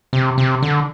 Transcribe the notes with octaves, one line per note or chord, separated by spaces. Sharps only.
C3
C3
D3